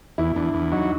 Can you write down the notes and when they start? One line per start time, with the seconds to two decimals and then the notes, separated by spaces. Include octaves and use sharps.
0.18 E2 E4
0.36 E2 D4
0.54 E2
0.72 F#3 D#4